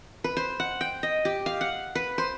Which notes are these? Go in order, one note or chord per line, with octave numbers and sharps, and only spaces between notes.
B4
C5
F#5
G5
D#5
G4
F5
F#5
B4
C5